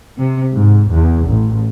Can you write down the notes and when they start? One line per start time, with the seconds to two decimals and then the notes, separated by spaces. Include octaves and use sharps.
0.19 C3
0.53 G#2
0.92 E2
1.28 A1